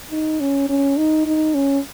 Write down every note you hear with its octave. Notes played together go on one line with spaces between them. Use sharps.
D#4
C#4
C#4
D#4
D#4
C#4